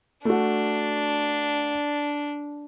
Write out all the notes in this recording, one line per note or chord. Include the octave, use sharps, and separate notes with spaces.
A3 D4 F#4